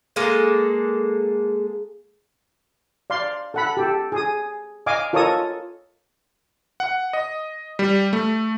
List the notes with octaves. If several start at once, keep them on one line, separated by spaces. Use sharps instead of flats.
G#3 A#3 G#4 A4
D5 F5 C6
A4 F#5 B5
G4 A4
G#4 D#6
D#5 F5 G#5 D6
F4 A4 A#4 C#5 D#5 D#6
F#5
D#5
G3
A3